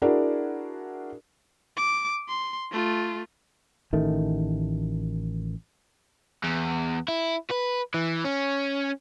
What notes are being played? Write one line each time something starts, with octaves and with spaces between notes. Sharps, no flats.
D4 E4 F#4 G#4 A#4 D5
D6
C6
A3 F4
A1 D#3 A3
E2
E4
B4
E3
C#4